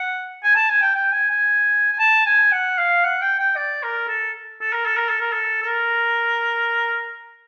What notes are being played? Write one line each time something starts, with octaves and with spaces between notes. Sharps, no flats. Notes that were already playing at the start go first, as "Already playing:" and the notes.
Already playing: F#5
G#5
A5
G#5
G5
G5
G#5
G#5
G#5
A5
G#5
F#5
F5
F#5
G5
G5
D5
A#4
A4
A4
A#4
A4
A#4
A4
A#4
A4
A4
A#4